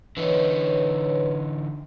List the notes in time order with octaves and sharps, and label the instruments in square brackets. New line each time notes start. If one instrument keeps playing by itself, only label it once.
[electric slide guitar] D3 E3 D#4 [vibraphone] B4 C#5